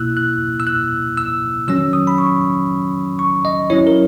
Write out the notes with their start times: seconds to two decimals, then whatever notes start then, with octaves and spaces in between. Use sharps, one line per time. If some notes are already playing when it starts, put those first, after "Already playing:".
Already playing: B2 A#3 E4 E6 F#6
0.17 F#6
0.60 E6
0.67 F#6
1.17 E6
1.68 D#3 F#3 C#4 E6
1.93 D#6
2.07 B5
2.18 C#6
3.19 C#6
3.45 D#5
3.70 F#3 C#4 E4 C#5
3.87 A#4